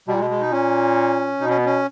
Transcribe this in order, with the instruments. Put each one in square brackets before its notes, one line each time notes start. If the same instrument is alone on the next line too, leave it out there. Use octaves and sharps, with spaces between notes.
[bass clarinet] B2 [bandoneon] G3
[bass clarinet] A#2
[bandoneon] G#3
[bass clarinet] B2
[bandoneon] G#3
D#4
[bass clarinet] A#2 [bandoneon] C#4
[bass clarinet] B2 [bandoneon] D#4
[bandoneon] C#4
B3
C#4